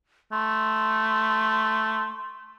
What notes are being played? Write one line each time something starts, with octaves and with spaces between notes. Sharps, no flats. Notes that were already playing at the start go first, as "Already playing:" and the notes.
A3 C6